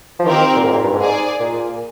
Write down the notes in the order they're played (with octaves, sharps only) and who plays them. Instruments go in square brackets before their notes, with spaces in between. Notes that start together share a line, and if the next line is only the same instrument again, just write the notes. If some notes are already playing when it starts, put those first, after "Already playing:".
[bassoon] F3
[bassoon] D#3 [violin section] C4 G4 A#4
[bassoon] A#2
G#2
A#2
G2
G#2
[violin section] G#4 D5 G#5
[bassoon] A#2